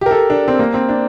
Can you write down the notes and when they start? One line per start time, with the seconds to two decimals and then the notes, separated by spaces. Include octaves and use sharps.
0.01 G4
0.06 A#4
0.11 A4
0.30 D4
0.48 C4
0.59 A#3
0.74 C4
0.89 D4